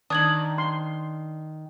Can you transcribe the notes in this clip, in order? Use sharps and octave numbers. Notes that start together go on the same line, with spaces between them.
D#3 D4 D#6 G#6 F#7
C6